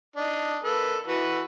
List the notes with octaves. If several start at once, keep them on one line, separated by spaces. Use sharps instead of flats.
D4 D#4
A#3 A4 B4
E3 F#4 B4